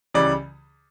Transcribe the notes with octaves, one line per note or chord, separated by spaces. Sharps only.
C#2 C#3 E3 G3 D5